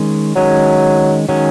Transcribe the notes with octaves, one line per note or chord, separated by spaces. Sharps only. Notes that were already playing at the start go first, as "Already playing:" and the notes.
Already playing: D#3 G#3 C#4
D#3 F#3 G#3 C#4
D#3 F#3 G#3 C#4